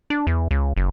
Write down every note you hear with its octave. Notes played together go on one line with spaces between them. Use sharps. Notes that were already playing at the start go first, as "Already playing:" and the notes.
D4
E2
C#2
F#1